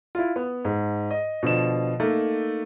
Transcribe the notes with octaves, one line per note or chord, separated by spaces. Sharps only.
E4 F4
B3
G#2
D#5
B2 D3 F3 E7
A3 A#3 D#4